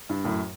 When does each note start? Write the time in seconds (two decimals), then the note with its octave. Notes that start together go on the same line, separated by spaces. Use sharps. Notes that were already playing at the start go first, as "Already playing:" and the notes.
0.09 G2
0.24 F#2 A2